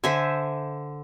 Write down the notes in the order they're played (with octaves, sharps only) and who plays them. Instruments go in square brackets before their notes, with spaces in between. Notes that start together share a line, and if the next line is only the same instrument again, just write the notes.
[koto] D3 [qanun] C5 E5 G#5